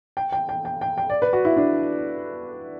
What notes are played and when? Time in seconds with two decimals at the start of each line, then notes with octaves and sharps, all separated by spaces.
0.17 G5
0.32 G5
0.49 G5
0.65 G5
0.81 G5
0.98 G5
1.10 D5
1.22 B4
1.33 F#4
1.45 E4
1.56 D4